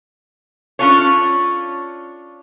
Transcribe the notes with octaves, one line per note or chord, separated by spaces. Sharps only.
C#4 D4 F4 A4 C#5